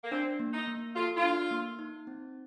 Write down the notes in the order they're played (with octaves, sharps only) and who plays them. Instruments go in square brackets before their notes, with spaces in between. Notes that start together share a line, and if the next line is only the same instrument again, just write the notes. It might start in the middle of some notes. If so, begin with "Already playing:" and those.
[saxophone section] A#3
[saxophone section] C4 [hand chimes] D4
[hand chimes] A#3
[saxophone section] D#4
[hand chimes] A#3
[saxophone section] F4 [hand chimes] A4
[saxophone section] F4
[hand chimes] D4
A#3
D#4
C4